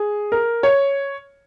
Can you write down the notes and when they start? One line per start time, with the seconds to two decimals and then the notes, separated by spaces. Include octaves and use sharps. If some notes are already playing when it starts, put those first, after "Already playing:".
Already playing: G#4
0.32 A#4
0.63 C#5